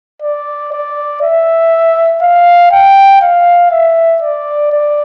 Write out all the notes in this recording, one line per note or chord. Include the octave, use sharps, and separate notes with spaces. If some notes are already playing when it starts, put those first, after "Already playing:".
D5
D5
E5
F5
G5
F5
E5
D5
D5